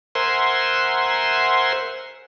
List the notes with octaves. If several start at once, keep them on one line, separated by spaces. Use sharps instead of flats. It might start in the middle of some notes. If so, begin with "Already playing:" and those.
A#4 C5 E5 F#5 G#5 C6